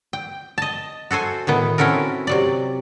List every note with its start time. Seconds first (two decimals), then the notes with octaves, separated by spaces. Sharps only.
0.13 G5
0.58 D#5 A5
1.11 F#4 A4 C5 G#5
1.47 A2 D#3 B3
1.78 C4 C#4 E4 F#4 A4 A#4
2.27 C3 F#3 D5